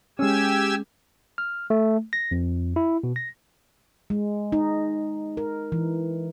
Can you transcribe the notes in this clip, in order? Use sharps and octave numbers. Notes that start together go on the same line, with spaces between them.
G#3 C#4 G4 G#5 E6
F6
A3
A#6
F2
E4
B2
A#6
G#3
D#4
A#4
E3